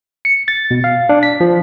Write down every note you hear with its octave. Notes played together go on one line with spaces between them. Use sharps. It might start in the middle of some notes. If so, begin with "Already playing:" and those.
C#7
A6
B2
F5
D4
B6
F3